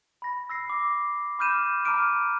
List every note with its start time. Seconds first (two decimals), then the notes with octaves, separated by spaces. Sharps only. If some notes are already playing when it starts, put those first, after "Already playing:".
0.22 B5 A#6
0.49 E6 A#6 C7
0.70 D6
1.39 B5 D6 F6 G6 D#7 E7
1.85 A#5 B5 D6 F6 D7 D#7